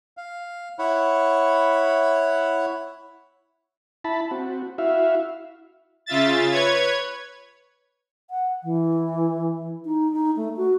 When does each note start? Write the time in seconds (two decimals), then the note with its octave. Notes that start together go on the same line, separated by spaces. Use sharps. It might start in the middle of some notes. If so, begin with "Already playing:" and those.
0.17 F5
0.79 E4 C#5 F#5 B5
4.04 E4 A5 B5
4.31 C4 F#4
4.78 E4 F#4 E5 F5
6.06 C#3 F4 E5 A6
6.51 B4 C#5 G#6
8.30 F#5
8.64 E3
9.85 D#4
10.12 D#4
10.36 A3
10.57 F#4